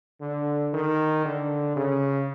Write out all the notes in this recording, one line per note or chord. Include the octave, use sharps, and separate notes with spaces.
D3
D#3
D3
C#3